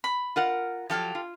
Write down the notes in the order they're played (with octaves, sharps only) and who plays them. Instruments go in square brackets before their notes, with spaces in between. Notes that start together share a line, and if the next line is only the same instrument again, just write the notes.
[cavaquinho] B5
[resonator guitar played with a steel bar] F4 A#4 F#5
[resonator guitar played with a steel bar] F3 F#3 [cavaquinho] G4 A4 F5
[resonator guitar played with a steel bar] F4